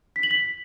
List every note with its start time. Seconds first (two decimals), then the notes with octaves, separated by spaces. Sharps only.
0.16 B6
0.23 F#7
0.31 B6